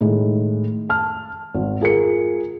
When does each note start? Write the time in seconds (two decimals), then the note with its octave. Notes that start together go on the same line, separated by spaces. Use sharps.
0.01 A2 D#3 G#3
0.89 A5 F6
1.54 G#1
1.81 F4 G#4 A#4 C#7